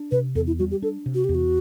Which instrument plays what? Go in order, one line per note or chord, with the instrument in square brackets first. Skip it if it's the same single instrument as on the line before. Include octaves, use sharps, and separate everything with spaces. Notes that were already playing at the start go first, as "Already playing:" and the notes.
Already playing: [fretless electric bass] D4
[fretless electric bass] C3 [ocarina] B4
[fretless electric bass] E2 [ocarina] A4
[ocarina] E4
[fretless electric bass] G3 [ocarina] F#4
[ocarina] G4
[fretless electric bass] D4 [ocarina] A4
[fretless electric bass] C3
[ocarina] F#4
[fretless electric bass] E2 [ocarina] G4
[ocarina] F#4